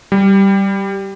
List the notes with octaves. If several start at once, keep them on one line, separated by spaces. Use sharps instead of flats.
G3